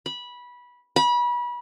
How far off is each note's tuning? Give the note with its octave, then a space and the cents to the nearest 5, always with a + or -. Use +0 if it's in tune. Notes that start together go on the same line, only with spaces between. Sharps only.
B5 -15
B5 -30